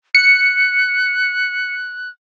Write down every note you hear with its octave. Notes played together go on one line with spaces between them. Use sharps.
F#6 C#7